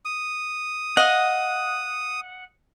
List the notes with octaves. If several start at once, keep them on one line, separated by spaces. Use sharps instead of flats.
D#6
D#5 F5 F#5